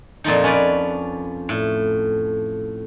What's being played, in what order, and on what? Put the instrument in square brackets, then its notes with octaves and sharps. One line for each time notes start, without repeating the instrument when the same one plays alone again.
[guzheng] F2 A#2 F3 D#4
C#4 B4 D5
A2